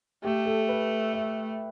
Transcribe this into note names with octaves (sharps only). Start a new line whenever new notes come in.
A3 G4
A4
B4
E5